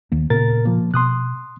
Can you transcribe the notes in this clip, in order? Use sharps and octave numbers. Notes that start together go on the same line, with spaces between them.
D#2 D#3 A#3
A#2 C#3 B3 A#4 A6
F3 A#3
B2 C6 D#6 F#6